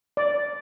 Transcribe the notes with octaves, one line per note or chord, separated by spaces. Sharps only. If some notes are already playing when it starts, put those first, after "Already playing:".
D5